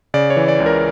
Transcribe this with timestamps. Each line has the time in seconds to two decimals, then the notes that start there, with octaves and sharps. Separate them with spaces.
0.14 C#3 D5
0.30 C#5
0.37 E3
0.48 D5
0.60 C#2
0.66 A#4